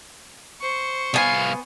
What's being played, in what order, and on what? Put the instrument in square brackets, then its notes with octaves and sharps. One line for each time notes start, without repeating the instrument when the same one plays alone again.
[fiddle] C5 C#6
[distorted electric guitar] C2 F5 [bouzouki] B3 G#5